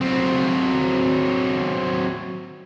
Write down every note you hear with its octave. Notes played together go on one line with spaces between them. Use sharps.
F#3 C4